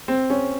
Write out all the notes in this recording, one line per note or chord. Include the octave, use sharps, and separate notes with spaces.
C4
C#4